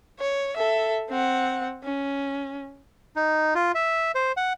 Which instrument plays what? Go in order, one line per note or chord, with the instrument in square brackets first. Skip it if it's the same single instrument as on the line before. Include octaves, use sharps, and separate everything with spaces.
[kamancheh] C#5
A4 E5
C4 F#5
C#4
[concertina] D#4
F4
E5
C5
F#5